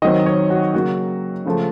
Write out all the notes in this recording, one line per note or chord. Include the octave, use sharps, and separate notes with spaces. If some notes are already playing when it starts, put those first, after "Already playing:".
D#3 F#3 C4 D#5
C#5
F#4
C#3 F#3 A#3 F#4
C#3 F3 A3